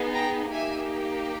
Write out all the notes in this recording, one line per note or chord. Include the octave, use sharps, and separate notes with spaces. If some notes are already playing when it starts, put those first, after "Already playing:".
Already playing: B3 D#4 G#4
G5 A#5
A#3 D#4 G4 E5 G#5